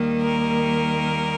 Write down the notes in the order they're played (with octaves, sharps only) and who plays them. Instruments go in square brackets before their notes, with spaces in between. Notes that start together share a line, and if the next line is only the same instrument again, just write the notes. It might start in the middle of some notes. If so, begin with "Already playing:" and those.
Already playing: [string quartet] D#2 D#3 G3 A#3
A#4